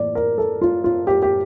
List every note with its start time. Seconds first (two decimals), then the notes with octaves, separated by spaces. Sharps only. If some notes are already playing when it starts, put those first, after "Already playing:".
Already playing: A2 E3 A#3 D5
0.15 A#4
0.38 A4
0.62 F4
0.84 F4
1.07 G4
1.22 G4